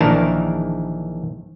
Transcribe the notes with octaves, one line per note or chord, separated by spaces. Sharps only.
A#1 D#3 E3 D4 A#4 A5